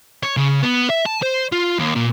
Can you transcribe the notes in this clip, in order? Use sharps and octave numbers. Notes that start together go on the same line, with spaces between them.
C#5
C#3
B3
E5
A5
C5
F4
D#2
A#2